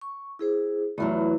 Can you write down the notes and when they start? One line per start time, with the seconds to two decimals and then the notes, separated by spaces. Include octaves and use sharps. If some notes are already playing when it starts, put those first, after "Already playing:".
0.01 C#6
0.39 E4 G#4 C5
0.98 E2 E3 F#3 A3 F4